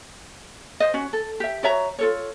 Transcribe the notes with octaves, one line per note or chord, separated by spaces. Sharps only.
C5 D#5
C#4 F#4
A4
G4 E5
F#4 C#5 E5 A#5
F4 A4 C#5